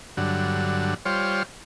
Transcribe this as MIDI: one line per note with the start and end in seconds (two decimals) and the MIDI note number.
0.17 0.94 43
0.17 0.94 50
0.17 0.94 54
1.05 1.43 55
1.05 1.43 65
1.05 1.43 72
1.05 1.43 73